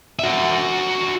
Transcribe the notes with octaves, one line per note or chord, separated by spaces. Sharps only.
F#4 E5